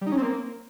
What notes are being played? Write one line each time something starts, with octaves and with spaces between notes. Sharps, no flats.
G3
D#4
C#4
C4
A#3